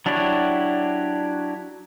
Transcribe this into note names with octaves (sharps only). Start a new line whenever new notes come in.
F#3 D4 E4 F#4 G4